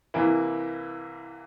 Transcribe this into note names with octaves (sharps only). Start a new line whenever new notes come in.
C2 C3 E3 A#3 E4